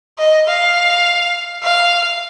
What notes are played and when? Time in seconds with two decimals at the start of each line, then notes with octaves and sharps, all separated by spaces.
0.18 D#5
0.47 F5
1.63 F5